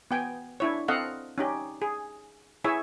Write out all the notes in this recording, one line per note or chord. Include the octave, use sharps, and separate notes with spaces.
B3 G5 G#5
D4 E4 C#5
C4 A4 D#5 F5 F#5
C#4 D#4 G4
G#4
E4 G#4 C#5 E5 G#5